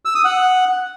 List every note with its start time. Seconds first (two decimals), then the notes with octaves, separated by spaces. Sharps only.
0.05 E6
0.15 D#6
0.25 F#5